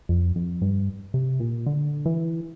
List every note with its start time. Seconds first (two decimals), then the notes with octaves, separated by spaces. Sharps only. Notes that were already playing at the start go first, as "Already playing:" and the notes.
0.09 F2
0.36 F2
0.62 G2
1.14 C3
1.40 A#2
1.66 D3
2.06 E3